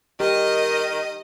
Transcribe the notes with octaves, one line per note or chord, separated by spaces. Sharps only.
D#3 G4 A#4 D#5